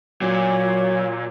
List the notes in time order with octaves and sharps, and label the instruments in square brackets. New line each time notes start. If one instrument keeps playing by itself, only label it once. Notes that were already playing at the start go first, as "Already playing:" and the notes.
[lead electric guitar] A#2 [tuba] F#3 [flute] C#5